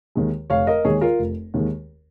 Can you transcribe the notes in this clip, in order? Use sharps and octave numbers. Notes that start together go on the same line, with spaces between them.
D#2 D#3 G#3
F1 C#5 F5
A#4 D#5
D#2 D#3 G#3 G#4 C#5
F4 A#4
F1
D#2 D#3 G#3